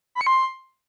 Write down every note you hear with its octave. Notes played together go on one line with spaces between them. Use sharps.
B5
C#7
C6